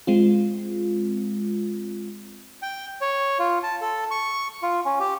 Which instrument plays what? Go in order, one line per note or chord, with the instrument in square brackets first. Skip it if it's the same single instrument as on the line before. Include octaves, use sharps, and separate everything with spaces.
[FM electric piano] G#3 C4 F4
[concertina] G5
C#5
F4
A5
A4
C#6
F4
C#4
G4